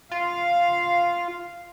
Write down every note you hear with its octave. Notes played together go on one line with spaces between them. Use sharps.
F4 F5